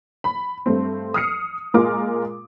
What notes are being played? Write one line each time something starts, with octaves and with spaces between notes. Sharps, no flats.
B5
G2 A3 C4
D#6 F6 C7 C#7
A#2 G#3 F4 A#4 D6